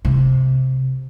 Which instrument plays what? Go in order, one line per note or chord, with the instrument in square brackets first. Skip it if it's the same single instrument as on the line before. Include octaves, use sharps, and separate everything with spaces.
[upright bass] C3